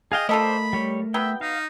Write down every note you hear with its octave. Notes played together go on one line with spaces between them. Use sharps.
G#4 D#5 F5 G5
A3 F4 A4 A#4 C5 D5 D#5 B5
G3 C#5
F#3 B3 E5 G5
D#4 F5